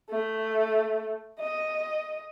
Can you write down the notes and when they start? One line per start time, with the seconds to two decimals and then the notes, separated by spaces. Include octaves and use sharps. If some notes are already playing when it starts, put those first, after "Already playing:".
0.10 A3
1.40 D#5